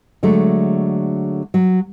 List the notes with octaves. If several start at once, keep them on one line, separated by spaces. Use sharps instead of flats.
D3 F#3 G#3 A3
F#3